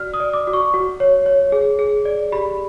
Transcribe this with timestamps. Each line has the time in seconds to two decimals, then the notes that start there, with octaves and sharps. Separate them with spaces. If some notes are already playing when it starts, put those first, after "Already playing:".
Already playing: F#4 D5 F6
0.14 D#6
0.20 D5
0.33 D6
0.47 F#4
0.53 C#6
0.74 F#4
1.00 C#5
1.26 C#5
1.52 G#4
1.79 G#4
2.05 D5
2.32 G4 B5